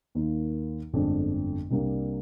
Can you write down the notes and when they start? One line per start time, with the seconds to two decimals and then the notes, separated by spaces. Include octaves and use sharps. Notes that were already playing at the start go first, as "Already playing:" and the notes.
0.15 D#2 D#3 A#3 D#4
0.93 G1 F2 D3 G#3 D4
1.71 C2 C3 G3 A#3 D4